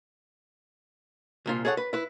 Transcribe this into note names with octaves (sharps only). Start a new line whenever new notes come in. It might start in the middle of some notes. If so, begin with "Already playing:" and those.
C2 A#2 F4
G#4 A4 C#5 D5 F#5
B4
E4 B4